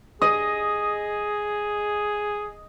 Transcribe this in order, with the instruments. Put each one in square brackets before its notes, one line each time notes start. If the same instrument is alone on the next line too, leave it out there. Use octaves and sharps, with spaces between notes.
[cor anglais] G#4 [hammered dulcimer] D#5